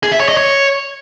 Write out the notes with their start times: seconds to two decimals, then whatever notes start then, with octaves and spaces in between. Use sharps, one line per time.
0.03 G#4
0.12 E5
0.20 C#5
0.29 D#5
0.37 C#5